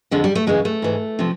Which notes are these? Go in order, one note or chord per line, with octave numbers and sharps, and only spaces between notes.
F2 D3 F3 G#3
G3
A3
F#2 C#3 E3 G#3
A3
G#2 E3
C3 F3